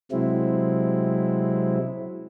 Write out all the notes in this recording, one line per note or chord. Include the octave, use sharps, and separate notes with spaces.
C3 F#3 G#3 C4 E4